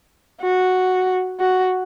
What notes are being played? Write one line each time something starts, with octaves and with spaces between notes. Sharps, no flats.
F#4
F#4